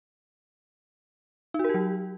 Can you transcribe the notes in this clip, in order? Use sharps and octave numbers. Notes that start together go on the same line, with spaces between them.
D#4
F#4
A#4
G4
F#3